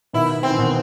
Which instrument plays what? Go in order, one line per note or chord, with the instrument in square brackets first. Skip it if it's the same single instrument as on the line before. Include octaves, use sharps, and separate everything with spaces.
[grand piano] B2 D#3 [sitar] E4
[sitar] C4
[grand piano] E3
B2 D#3